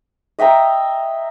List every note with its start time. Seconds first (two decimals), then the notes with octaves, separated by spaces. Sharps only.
0.39 D#5 E5 G5 A#5